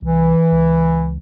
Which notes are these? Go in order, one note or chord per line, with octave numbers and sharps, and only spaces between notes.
C2 E3
C#2